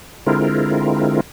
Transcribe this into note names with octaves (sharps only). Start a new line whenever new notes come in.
D3 G#3 C4 E4 F4 A#4